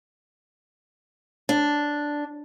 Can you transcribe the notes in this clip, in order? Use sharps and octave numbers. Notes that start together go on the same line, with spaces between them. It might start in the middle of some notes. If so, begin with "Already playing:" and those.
D4